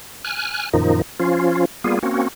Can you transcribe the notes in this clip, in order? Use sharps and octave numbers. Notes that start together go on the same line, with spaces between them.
G#5 F6 F#6
F#2 A#2 D#3 F3 D#4
F3 C#4 F4
G3 A#3 B3 F4 G#4
A#3 C4 C#4 F#4